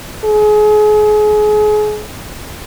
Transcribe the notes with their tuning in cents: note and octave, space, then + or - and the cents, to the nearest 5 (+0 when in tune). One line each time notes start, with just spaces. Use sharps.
G#4 +30